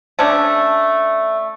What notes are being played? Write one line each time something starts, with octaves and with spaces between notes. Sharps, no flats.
A3 C#4 D4